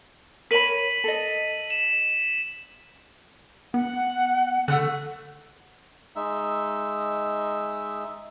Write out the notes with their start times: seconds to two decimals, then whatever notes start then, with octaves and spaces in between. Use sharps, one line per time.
0.51 A#4 C#5 B5 B6 D#7 F#7
1.04 A4 D#5
1.70 E7
3.74 B3 F#5
4.68 D3 A3 F#4 F#6
6.16 G#3 D#4 E5